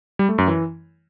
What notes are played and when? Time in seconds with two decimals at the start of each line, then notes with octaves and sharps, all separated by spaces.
0.19 G3
0.29 A3
0.38 F#2
0.48 E3